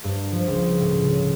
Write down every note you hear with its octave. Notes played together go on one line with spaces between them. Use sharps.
G2
F3
C#2
A2
C#3